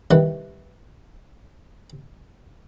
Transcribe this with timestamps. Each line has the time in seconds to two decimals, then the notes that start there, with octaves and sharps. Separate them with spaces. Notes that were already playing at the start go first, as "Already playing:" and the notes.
0.11 C2 D#3 E3 F#5